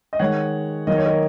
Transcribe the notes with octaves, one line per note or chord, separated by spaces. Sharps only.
D#5
D#3 G#3 C#5 F#5
D#3 F#3 A#3 D#5
C#5
A#4 D#5